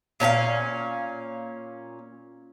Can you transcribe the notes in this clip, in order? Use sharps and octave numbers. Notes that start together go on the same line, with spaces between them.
A#2 C#4 D4 F5